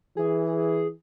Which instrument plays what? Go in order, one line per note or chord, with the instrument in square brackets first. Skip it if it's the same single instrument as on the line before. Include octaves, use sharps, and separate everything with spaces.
[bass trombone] E3 [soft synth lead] G#4